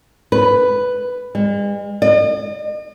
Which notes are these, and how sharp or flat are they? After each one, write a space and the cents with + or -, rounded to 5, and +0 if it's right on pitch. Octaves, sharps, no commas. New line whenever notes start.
B4 +5
G#3 -45
D#5 -45